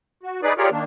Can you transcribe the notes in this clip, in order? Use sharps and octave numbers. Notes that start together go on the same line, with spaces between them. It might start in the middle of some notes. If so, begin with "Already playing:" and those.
F#4
D#4 G#4 B4 D5
F4 G4 G#4 A#4 C#5 D5
D#3 A#3 D4